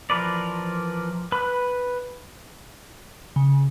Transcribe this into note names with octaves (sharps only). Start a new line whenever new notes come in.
E3 F3 A#4 B4 D5
B4 B5 F#6
C#3